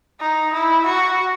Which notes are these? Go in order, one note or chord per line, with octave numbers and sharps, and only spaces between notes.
D#4
E4
F#4